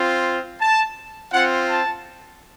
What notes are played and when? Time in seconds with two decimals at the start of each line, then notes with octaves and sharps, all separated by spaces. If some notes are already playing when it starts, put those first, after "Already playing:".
Already playing: C4 F4
0.61 A5
1.32 C4 F4 F#5
1.68 A5